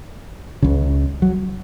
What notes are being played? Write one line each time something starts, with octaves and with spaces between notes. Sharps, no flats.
C#2 C#3
F#3